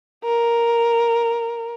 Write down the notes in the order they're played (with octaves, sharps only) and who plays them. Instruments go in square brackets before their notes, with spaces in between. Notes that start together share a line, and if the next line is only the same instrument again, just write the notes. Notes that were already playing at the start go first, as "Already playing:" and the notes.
[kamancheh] A#4